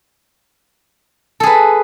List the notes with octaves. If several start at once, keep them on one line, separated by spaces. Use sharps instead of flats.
G#4 A4 B4